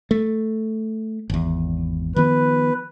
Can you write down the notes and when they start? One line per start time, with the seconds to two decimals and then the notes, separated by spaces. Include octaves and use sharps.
0.11 A3
1.30 G#1 E2
2.16 D#3 F3 B3 B4